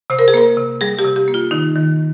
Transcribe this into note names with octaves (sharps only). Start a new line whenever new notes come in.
C3 C5
A#4
G#4
A#3 A#4
C3
G3 G#4
G4
C3
G4
A#3
F4
D#3 D#4
D#3